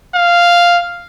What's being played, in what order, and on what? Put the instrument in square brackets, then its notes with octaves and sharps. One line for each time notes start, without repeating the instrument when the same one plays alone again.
[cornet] F5